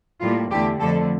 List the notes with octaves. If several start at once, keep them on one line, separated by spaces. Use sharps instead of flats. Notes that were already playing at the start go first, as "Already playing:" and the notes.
A2 G3 A#3 F4
E2 D3 A3 G4
F2 D3 A3 A4